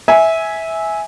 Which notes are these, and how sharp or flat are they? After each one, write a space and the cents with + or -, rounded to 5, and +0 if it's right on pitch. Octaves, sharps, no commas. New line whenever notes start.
E5 -15 G#5 +0